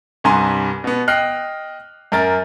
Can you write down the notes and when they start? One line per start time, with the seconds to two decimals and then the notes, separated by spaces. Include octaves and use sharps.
0.24 C2 G2 G#5 A#5 C6
0.84 B2 B3
1.08 D#5 G5 F6 F#6 C7
2.12 F#2 A#4 A6